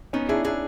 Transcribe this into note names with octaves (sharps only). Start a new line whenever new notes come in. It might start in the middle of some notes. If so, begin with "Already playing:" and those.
B3 C#4 D#4
D4 E4 G#4
D4 E4 G#4